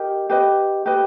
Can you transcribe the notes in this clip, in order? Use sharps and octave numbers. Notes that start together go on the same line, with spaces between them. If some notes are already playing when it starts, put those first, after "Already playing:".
Already playing: G4 A#4 D#5
G4 B4 D#5
G4 B4 D#5